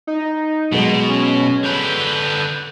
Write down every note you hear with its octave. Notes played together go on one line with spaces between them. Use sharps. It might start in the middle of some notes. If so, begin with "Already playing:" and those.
D#4
B2 F#3 G#3
C#4
D3 B4 G6